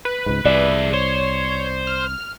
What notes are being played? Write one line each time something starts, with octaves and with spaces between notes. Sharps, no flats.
B4
C#2 G#2
C2 G#4 D5 E5
C5 C#5
F6